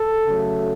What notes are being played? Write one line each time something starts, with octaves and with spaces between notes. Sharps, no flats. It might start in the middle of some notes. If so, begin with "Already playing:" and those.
Already playing: A4
C#3 F#3 A3